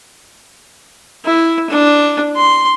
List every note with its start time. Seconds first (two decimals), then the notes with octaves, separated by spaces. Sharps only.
1.25 E4
1.70 D4
2.37 C6